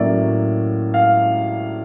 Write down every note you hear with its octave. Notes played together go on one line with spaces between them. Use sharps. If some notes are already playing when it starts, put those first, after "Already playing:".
Already playing: A2 F#3 A#3 C#4 D5 E5
F5